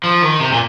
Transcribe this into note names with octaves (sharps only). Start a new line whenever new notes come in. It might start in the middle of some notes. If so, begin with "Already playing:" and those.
F3
D#3
C3
A#2